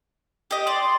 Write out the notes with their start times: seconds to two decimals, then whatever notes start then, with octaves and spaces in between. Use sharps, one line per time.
0.51 G4 D#5
0.67 D5 C6